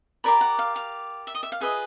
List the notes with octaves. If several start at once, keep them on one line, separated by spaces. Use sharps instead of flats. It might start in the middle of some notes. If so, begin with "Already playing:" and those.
G4 A#4 D5 B5
F#5
F5
F5
E5
D#5
E5
F5
F4 G#4 B4 D#5 E5